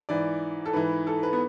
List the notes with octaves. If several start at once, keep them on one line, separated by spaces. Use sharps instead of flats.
G#2 E3 D5
A4
G#2 E3 B4
A4
B4
B3